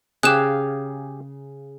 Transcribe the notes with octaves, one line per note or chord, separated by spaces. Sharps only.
C#3 G4 G#4 F5 F#6 E7